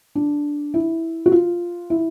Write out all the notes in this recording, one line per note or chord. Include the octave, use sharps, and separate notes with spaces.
D4
E4
F#4
F4
E4